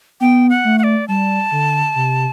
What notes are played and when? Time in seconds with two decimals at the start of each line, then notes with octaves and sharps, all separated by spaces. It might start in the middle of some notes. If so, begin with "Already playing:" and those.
0.21 B3 G5
0.50 F#5
0.65 A3
0.79 F#5
0.84 D5
1.08 G3 A5
1.52 D3
1.95 C3